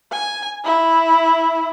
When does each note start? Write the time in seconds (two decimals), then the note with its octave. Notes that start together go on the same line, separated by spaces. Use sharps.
0.12 G#5
0.65 E4